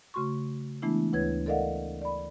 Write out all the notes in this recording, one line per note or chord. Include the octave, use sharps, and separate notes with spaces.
C#3 A3 F#4 C6 C#6
E3 G#3 A3 B3 D4 E4
D2 E4 B4 C#5 G#6
A4 A#4 D5 D#5 F5 F#5
D5 B5